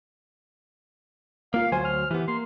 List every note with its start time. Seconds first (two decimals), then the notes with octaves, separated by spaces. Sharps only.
1.54 A#3 F4 F5
1.72 D2 F#3 C5 G#5
1.85 F6
2.11 E3 B3 G4
2.28 A#3 C6